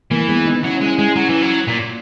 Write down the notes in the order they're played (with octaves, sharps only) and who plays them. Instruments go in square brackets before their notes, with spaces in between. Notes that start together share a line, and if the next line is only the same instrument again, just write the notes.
[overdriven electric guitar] E3 [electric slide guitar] A#3
[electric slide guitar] G#3 B3
B3 D#4
[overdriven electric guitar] F#3 [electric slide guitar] C#4 E4
[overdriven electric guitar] G#3
G#3
F#3
E3
F#3
A#2